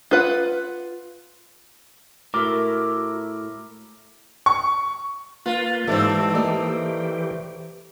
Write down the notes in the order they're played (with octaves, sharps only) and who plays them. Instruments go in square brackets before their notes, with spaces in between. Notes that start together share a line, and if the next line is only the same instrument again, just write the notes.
[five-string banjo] F4 B4 F#5
[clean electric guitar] A2 [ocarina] F#4 [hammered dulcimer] A#4 E5 [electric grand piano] D6
[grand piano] C#6
[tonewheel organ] A#3 B4 [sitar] F4
[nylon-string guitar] G#2 D#4 D5 [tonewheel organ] E3 G4 [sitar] A3 C4
[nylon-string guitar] A#3 D5 D#5